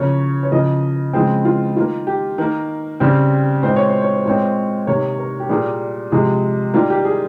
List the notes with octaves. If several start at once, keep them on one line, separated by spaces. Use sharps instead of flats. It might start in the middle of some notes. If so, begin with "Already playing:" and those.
Already playing: C#3 F3 A#3 C#5
C#5
C#3 F3 A#3 D#5
C#3 F3 G#3 C4 G#4
F4
D#3 A#3 F4
G4
D#3 A#3 A#4
C#3 G3 C4
A#2 G#3 C4 C5
C#5
C5
C#5
C5
A#2 G#3 C4 C#5
C5
C3 D#3 A#3 C#5
A#4
G4
A#2 G3 A#3 G#4
C3 F3 G#3 G#4
D#3 G3 A#3 F4
G4
G#4